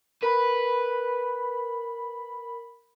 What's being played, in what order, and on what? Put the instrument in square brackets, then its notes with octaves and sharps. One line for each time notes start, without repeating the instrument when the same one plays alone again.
[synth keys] A#4 B5 [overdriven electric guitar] B4